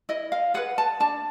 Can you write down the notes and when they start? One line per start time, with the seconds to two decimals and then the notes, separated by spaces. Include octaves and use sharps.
0.09 E4 D#5
0.32 F5
0.54 G#4 B4 F#5
0.78 A5
1.00 D4 A5